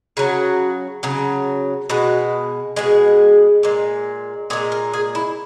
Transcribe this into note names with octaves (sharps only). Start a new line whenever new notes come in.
C#3 F#3 F#4
C#3 F#3
B2 G#3 F#4
B2 G#3 G#4
A#2 G#3
A#2 G#3 G#4
A#4
G#4
E4